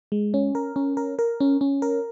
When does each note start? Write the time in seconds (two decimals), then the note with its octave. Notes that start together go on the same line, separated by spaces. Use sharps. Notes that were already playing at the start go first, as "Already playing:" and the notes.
0.12 G#3
0.34 C#4
0.55 A#4
0.76 C#4
0.97 A#4
1.19 A#4
1.40 C#4
1.61 C#4
1.82 A#4